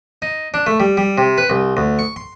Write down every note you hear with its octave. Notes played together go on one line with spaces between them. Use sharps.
D#4
D4
A3
G3
G3
C3
B4
C2
D2
C#6
C6